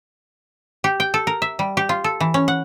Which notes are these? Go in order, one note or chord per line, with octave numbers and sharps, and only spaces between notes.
G4
G5
A4
A#4
E5
G3
G4
F4
A4
E3
C#4
F#5